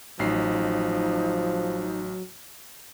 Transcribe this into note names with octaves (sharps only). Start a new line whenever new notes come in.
A1 F3 F#3 D#4 C7